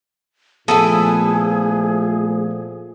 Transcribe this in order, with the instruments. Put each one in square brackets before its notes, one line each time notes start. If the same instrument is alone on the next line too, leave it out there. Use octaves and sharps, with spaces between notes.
[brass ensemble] A#2 F3 A3 [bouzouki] B3 E4 G#5 [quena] G#4 [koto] A4